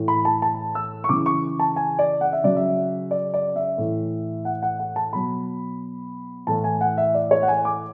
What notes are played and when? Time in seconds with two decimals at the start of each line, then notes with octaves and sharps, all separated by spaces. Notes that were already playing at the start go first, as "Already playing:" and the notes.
Already playing: A2 E3
0.08 B5
0.25 A5
0.42 A5
0.75 E6
1.04 C#6
1.09 C#3 E3 D6
1.26 C#6
1.59 A5
1.76 G#5
1.99 D5
2.21 F#5
2.33 E5
2.44 C#3 F#3 D5
2.56 E5
3.11 D5
3.34 D5
3.56 E5
3.78 A2 E3
4.45 F#5
4.62 F#5
4.79 F#5
4.96 A5
5.13 B2 F#3 B5
6.47 A2 E3 A5
6.64 G#5
6.81 F#5
6.98 E5
7.14 D5
7.31 C#5
7.43 F#5
7.48 G#5
7.65 D6